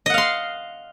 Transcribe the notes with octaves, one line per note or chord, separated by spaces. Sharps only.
D#5 F5 F#5 C6